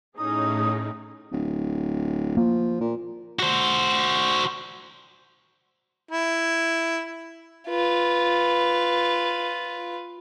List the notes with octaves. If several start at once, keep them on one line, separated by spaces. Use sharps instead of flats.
A2 C#4 D#4 G#4 D#6
D1
F3 A#3
A#2
F#4 C5
E4
F4 B4